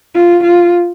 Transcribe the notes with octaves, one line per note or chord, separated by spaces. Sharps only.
F4
F4